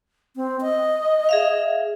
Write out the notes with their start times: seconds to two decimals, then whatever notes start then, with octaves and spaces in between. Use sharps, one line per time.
0.36 C4
0.61 D#5
1.29 G#4 E5 F5